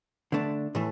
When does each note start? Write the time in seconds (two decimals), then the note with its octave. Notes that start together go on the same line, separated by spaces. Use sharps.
0.32 D3 A3 D4
0.75 A2 E3 A3